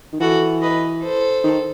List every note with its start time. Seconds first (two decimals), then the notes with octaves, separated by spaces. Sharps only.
0.12 D#3
0.20 E3 F#4 A4
0.62 B4 D#5
1.03 A4 C5
1.44 D#3